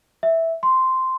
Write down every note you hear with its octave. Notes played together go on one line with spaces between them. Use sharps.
E5
C6